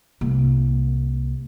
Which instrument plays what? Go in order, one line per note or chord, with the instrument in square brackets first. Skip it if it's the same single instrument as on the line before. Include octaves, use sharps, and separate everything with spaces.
[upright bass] C2 A#3